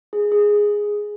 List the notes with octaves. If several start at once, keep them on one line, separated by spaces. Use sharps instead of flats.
G#4
G#4